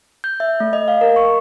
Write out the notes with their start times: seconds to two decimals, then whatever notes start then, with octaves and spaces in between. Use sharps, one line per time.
0.24 G6
0.40 E5
0.60 A3
0.73 D#5
0.88 F5
1.01 A#4
1.16 C#6